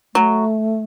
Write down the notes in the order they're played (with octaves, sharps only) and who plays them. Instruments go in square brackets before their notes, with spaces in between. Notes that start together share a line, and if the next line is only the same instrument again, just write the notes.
[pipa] F#3 [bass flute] A3